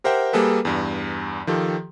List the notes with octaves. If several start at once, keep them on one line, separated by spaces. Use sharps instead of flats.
G4 A#4 C5 E5 F#5 G5
G3 A#3 G#4 A4 B4
E2 G2
D#3 F3 G4 A4